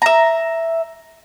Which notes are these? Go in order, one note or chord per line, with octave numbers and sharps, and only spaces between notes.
E5 A#5